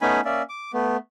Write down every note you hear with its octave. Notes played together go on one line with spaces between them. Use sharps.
A3 B3 C#4 D#4 G#5 B5
A#3 C#4 D5 E5
D6
A3 B3